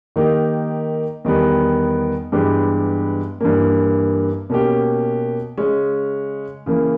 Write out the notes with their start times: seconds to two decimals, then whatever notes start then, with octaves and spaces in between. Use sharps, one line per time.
0.16 D#3 A#3 D#4 G4
1.25 E2 D#3 G3 B3
2.32 G2 E3 G#3 B3 G4
3.41 G2 E3 A#3
4.50 B2 A#3 C#4 G4
5.58 C#3 G#3 C#4
6.66 C#3 E3 A#3